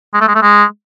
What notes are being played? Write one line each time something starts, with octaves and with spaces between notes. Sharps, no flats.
G#3
A3
G#3
A3
G#3